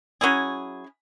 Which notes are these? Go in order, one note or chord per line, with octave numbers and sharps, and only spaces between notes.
F#3 C#4 E4 G#4